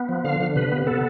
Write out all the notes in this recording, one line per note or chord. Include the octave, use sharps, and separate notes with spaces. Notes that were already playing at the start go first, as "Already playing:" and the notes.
Already playing: B3
F3
D3 F5
D3
C3 B4
B3
B3 A4